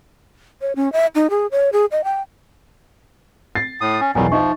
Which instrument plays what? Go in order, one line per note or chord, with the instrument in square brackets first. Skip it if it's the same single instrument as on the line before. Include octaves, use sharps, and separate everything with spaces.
[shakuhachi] C#5
C#4
E5
D#4
G#4
C#5
G#4
D#5
G5
[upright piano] A6 C7
[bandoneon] A2 D#6
C#4
[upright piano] B1 E2 [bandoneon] D#3 F#3 G3 [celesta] G#5
[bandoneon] F3 [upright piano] D#4 [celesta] D#5 E5 C#6